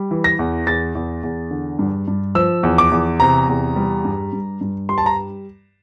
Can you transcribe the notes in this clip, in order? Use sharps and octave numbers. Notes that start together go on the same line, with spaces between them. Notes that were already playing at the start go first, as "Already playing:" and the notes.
Already playing: G3
E3
A#6
E2
E2 A6
E2
E2
D3
G2
G2
F3 E6
E2
D6
E2
C3 A#5
E2
G3
G2
G2
G2
G3 C6
A5
A#5